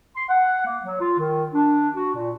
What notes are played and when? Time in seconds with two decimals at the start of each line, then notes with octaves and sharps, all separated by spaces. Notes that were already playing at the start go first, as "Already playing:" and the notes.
0.16 C6
0.29 F#5
0.65 A#3
0.84 F#3
1.00 F4
1.19 D#3
1.53 D4
1.95 F#4
2.15 A#2